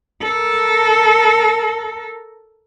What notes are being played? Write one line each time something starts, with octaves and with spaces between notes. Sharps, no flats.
A4 A#4